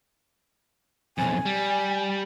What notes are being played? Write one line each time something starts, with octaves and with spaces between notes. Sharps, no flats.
B1 F2 G#5
G3